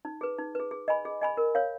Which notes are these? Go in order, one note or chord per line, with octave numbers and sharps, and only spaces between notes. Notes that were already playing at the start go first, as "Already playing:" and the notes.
D#4
G#4 B4
D#4
G#4 B4
G#4
D#5 G#5 B5
G#4
D#5 G#5 B5
A#4
C#5 F5